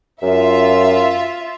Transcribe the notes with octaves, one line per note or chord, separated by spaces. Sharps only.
F#2 F4 E5